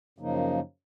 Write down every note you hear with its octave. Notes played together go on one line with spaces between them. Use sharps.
F#2 C#3 F3 A#3 D#4